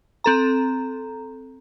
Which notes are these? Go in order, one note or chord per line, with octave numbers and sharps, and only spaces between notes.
C4 A4 A#5